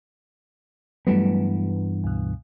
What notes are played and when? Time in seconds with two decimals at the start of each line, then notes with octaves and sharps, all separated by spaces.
1.07 G2 E3 F#3 G3 A3 B3
2.04 C#2 B2